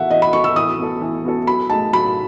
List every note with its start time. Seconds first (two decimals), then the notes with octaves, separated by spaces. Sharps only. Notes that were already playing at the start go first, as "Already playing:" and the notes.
Already playing: E3 B3 F#4 A4 E5 F#5
0.10 E3 D#5
0.22 B5
0.33 B3 F#4 A4 C#6
0.44 E6
0.56 E3 D#6
0.79 B3 F#4 A4
1.01 E3
1.24 B3 F#4 A4
1.47 F#3 B5
1.70 A3 D#4 G#4 A5
1.93 F#3 B5